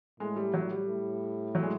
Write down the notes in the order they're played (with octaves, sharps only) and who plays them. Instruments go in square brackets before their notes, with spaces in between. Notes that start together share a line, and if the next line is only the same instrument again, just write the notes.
[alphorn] A2 [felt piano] G#3
[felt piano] G3
F#3
G3
[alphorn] A2
[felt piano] F#3
G#3